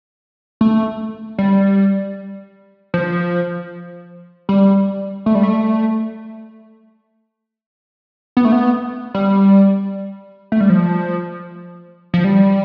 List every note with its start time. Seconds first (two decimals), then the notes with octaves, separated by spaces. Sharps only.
0.61 A3
1.38 G3
2.94 F3
4.49 G3
5.26 A3
5.35 G3
5.43 A3
8.37 B3
8.45 A3
8.52 B3
9.14 G3
10.52 A3
10.60 G3
10.70 F3
12.14 F3
12.24 G3